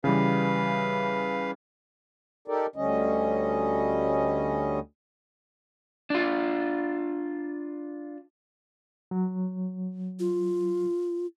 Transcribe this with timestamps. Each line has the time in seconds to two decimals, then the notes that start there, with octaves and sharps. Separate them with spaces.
0.04 C#3 E3 G3 B4 F5
2.48 D#4 G4 A4 A#4 D5
2.76 D2 D3 G3 C#4 D#5
6.10 D4 F4
9.11 F#3
10.20 F4